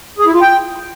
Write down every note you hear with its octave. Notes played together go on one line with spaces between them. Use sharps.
G#4
E4
F4
G5